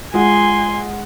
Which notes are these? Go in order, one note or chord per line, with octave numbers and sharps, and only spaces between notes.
G#3 F4 F#5 G#5 C6